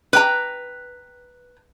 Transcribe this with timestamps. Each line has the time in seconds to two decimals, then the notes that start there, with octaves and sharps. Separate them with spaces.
0.13 B4 G5 A#5